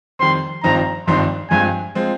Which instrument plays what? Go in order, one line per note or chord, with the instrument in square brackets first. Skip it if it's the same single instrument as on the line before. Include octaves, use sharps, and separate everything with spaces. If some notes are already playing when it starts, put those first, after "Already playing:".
[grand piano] F2 D#3 G3 C4 [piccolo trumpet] C6
[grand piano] G#1 G2 F3 C4 D#4 [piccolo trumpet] A#5
[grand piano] G#1 G2 F3 C4 D#4 [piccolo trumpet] C6
[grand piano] G2 F3 G#3 C4 [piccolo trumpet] G#5
[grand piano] F3 G#3 C4